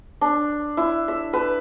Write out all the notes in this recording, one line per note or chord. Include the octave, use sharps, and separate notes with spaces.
D4
E4
E5
B4